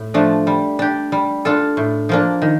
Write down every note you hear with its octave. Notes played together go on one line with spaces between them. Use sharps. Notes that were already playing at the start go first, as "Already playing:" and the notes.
Already playing: A2
F3 A3 D4
G3
D4 G4
G3
D4 F4 A4
A2
F3 A#3 D4
D#3